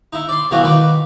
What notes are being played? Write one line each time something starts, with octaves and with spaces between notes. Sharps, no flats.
D#4 E4
D5 C6
B2 E3 F#3 A3 F4 F#4
D#3 B4 D6